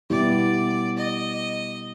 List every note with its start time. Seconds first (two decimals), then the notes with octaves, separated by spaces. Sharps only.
0.10 B2 G3 B3 E4 G4 D5
0.98 D#5